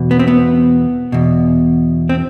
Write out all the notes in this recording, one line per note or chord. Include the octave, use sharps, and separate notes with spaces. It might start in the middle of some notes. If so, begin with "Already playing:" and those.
Already playing: E2 B2
B3
C4
B3
E2 B2
C4